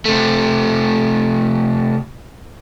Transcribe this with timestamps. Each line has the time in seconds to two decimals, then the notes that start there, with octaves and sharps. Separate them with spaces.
0.05 C3 A3